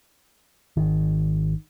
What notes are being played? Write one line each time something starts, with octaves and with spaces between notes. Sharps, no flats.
G#1 D#3